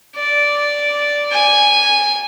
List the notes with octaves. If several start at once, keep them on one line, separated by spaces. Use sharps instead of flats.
D5
G#5